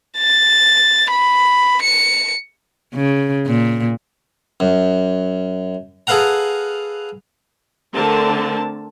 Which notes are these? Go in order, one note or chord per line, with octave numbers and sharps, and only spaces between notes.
A6
B5
C#7
C#3
A#2
F#2
G#4 A4 B4 F5 F#5 A#5
D3 A3 C4 A#4 A5